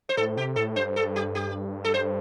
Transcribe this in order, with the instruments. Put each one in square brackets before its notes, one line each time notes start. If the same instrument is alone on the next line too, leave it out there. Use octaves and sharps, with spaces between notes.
[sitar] C5
[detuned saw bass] A2 [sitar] A4
[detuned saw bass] C3 [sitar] G4
[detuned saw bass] A2 [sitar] A4
[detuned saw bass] G2 [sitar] C5
[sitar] A4
G4
G4
A4
C5